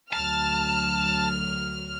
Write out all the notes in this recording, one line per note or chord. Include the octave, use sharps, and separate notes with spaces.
D2 F#3 A5 F6